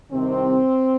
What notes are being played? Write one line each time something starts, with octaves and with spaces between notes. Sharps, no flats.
C2 C3 D#3 C4